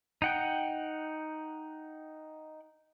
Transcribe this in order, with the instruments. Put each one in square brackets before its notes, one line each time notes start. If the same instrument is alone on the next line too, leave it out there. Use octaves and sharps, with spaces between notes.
[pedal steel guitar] D#4 F#5 G5